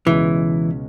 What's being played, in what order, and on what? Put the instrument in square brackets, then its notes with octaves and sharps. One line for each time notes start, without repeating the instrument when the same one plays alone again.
[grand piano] C#2 B2 G#3 C#4 [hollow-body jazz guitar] E3